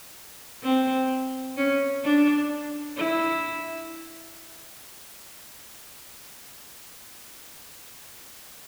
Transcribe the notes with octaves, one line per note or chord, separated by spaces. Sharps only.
C4
C#4
D4
E4